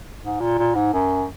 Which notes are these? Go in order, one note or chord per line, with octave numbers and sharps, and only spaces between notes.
G#2
A#2
A#2
G#2
F#2